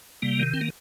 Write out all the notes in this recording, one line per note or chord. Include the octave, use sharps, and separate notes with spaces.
C3 G3 A#3
D#3
C4
A#3